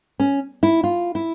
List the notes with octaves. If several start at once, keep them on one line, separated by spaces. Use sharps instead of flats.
C#4
E4
F4
E4